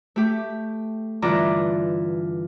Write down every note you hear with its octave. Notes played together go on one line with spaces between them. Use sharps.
A3 G4
G2 D3 E3 F4 D5 A#5